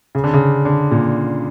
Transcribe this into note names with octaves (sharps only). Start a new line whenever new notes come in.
C#3
D3
C#3
D3
A#2